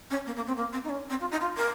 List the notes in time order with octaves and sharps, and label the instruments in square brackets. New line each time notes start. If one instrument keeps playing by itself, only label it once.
[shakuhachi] C#4
A#3
A#3
C4
A#3
C4
D#4
C#4
C4
F4
D#4
F4
A#4